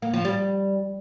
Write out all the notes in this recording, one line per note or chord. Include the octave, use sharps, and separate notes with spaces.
A#3
F3
G3